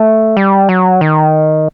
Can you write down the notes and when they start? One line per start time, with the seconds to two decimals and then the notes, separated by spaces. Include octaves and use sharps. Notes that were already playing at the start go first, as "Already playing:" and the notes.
Already playing: A3
0.37 G3
0.69 F#3
1.01 D#3